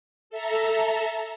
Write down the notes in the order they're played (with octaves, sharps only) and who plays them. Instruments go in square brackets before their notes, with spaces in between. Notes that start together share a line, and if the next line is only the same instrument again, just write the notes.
[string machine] A4 E5 A#5